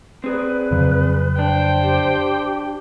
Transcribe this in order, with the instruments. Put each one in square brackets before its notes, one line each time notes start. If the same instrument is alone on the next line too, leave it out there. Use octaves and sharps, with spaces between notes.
[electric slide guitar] C4 G#4 D5 [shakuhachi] B4
[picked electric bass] F2 C#3 F#3
[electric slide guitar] D4 [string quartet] C5 G5
[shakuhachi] G4